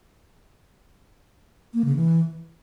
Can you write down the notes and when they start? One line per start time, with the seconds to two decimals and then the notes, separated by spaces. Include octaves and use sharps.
1.74 A#3
1.85 C#3
1.96 E3